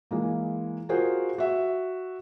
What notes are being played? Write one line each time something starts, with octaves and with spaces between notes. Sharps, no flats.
E3 G#3 A#3
F4 F#4 G#4 A#4 C5
F#4 E5